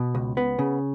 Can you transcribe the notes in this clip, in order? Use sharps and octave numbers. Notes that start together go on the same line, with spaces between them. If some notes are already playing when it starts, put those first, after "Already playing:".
Already playing: B2
C#2
B3
C#3